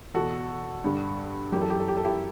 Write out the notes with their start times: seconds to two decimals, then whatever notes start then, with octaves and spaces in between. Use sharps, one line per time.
0.14 E2 B2 F#4 A4
0.84 G2 D3
1.52 F#2 G4
1.57 E3 A4
1.70 G4
1.79 A4
1.88 G4
1.96 A4
2.05 E4 G4